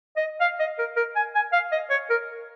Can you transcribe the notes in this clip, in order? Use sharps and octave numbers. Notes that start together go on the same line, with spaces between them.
D#5
F5
D#5
A#4
A#4
G#5
G#5
F5
D#5
C#5
A#4